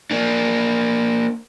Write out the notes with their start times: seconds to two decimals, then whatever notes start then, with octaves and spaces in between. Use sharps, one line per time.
0.11 A#3 D4